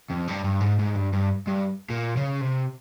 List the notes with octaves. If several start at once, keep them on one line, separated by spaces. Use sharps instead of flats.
F2
G2
G2
G#2
G#2
G2
G2
G2
A#2
C#3
C3